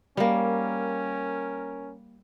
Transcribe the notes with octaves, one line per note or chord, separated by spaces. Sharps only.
G3 A#3 C#4 A#4